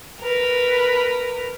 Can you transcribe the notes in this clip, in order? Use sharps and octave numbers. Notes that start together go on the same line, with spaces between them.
A#4 B4